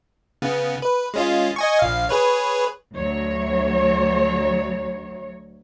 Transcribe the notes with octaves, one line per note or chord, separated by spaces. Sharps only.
C#3 B3
B4
G#3 C#4 F4
D#5 G#5 C#6
A#1 F5
G#4 B4 C#5
D2 F#3 C#5